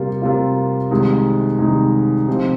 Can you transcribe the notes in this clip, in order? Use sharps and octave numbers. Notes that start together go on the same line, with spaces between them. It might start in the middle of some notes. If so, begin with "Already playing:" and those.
Already playing: C3 G3 A#3 F4
C3 G3 A#3 F4
C2 C3 D#3 G#3 D#4
C2 C3 D#3 G#3 D#4
C3 F3 C4 D#4 G4